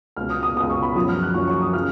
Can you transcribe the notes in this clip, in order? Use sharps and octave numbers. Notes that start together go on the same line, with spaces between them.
C#2 B2 F6
D#6
D#6
C#2 B2 D#6
C#6
B5
F#2 F3 D#6
F6
F#6
F#2 F3 C#6
C#6
D#6
C#3 F3 F6